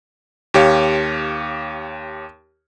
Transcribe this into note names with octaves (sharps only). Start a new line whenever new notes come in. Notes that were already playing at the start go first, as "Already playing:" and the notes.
D#2 G4 C#5 F5